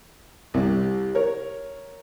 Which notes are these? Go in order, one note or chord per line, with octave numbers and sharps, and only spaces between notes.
C2 C3
A#4 C#5